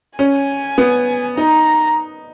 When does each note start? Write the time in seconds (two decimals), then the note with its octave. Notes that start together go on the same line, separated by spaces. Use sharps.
0.19 C#4 G#5
0.78 B3
1.37 D#4 A#5